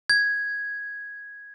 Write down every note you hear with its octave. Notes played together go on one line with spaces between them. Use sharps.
G#6